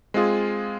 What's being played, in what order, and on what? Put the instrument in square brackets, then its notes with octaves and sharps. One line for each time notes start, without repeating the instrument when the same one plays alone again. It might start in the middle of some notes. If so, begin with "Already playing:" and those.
[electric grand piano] G#3 C4 F4 G#4